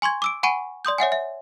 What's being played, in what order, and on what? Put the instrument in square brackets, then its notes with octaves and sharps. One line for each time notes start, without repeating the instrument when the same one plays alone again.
[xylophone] G#5 C6 C#6 G#6
D6 E6 D7
F#5 G#5 B5 C#6 D7 D#7
D5 C6 D#6 G6
C#5 E5 F#5 G#5
E5